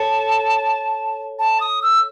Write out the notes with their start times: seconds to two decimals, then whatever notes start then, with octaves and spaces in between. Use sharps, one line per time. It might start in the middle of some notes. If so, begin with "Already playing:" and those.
Already playing: A4 C#5 A5
1.39 A5
1.61 D#6
1.82 E6